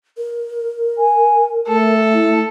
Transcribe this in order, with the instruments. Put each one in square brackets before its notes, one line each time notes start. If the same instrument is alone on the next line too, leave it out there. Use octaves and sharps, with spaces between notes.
[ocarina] A#4
[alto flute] G#5
[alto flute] A3 [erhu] A4
[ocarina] E4